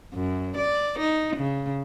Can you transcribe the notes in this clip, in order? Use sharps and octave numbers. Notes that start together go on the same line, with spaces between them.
F#2
D5
D#4
C#3